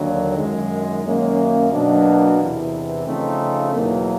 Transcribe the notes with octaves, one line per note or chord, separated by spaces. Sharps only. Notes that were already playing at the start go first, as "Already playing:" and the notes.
Already playing: D#2 D3 F#3 A#3 D4
F#2 D#3 G#3
F#2 D#3 F#3 A#3 C#4
B2 F#3 A#3 D4
E2 C3 E3
C#3 F3 A3 C4 D#4
E2 B2 F#3 A#3